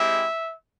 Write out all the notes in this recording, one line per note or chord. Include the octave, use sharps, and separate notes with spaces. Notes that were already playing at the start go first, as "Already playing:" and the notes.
Already playing: G#3 C4 E4 G4 E5